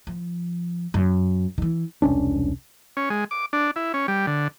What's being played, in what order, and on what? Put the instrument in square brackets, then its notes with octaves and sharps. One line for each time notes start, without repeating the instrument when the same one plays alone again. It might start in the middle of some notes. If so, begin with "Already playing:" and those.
[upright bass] F3
F#2
D#3 E3
[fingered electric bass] E1 C2 C#4 D4
[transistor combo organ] C#4
G#3
D6
D4
E4
C#4
G3
D3